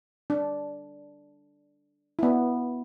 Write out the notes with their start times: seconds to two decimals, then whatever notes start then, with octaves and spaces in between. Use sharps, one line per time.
0.30 D4
2.19 B3 E4